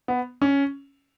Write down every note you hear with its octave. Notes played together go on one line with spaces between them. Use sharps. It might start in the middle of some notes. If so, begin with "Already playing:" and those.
B3
C#4